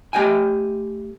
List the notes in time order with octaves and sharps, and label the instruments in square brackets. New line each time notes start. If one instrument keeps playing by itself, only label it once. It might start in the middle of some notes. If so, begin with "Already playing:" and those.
[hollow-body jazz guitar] A3 G4 D#5 G5 G#5